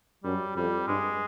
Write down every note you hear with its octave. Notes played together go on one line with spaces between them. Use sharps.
F#2 G3
F2 G3
G2 G#3